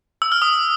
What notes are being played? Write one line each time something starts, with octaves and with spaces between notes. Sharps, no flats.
E6
F6
D#6